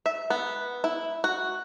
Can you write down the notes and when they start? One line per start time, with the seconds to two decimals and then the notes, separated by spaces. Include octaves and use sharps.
0.06 E5
0.30 B3
0.84 E4
1.24 F#4